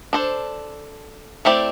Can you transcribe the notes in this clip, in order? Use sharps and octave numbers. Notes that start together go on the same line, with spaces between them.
D4 A4 C5
A3 C4 E4 G4 D5